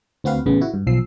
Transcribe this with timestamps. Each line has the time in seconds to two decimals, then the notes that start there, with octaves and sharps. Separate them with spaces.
0.24 D2 C4 F#4 B4 F5
0.46 A1 C#3 B3
0.61 E4 F#4
0.74 G2
0.87 B1 F3 E6 C7